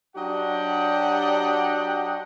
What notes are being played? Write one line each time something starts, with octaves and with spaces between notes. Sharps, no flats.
F#3 D4 G4 D#5 F#5 G5